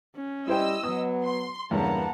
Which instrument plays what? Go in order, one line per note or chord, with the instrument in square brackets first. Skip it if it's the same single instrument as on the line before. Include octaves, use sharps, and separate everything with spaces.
[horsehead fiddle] C#4
[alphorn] G3 [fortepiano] E4 C5 G5 [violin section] D#5 E6
[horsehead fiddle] F#3 [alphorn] B3 [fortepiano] D#6
[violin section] C6
[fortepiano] E2 G2 [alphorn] C#3 [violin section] A#3 B3 A5 [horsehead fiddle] F#5 A#5